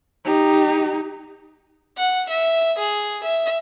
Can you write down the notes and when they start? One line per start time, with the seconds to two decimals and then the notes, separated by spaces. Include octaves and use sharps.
0.25 D#4 G4
1.98 F#5
2.30 E5
2.79 G#4
3.24 E5